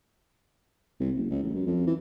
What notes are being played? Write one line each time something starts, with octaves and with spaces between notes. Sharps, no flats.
C2
F#1
C#2
A1
F#2
F2
E3